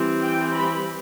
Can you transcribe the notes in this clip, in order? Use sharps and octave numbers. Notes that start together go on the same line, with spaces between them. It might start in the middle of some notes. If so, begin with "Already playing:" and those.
Already playing: E3 G3 C4
G5
B5